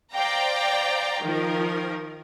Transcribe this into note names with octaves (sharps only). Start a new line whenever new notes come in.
C5 D5 F5 G5 A#5
D#3 F3 A#4